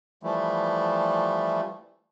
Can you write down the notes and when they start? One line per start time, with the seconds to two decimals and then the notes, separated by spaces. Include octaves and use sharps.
0.23 E3 F3 G3 A3